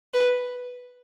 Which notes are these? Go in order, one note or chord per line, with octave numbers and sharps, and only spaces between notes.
B4